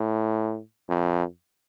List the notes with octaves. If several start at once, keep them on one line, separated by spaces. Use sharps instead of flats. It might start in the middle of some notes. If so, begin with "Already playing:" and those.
Already playing: A2
F2